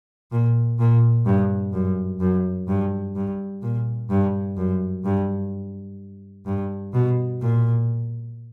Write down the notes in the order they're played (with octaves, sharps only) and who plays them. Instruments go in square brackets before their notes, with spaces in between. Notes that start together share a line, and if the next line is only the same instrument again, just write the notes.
[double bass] A#2
A#2
G2
F#2
F#2
G2
G2
A#2
G2
F#2
G2
G2
B2
A#2